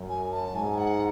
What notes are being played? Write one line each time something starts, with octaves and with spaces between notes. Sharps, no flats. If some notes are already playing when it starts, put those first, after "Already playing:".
Already playing: F#2
G#5
A5
G#2 G#5
F#5